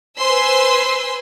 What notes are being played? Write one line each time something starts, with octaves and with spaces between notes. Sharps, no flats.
B4 C5 G#5 C6 E6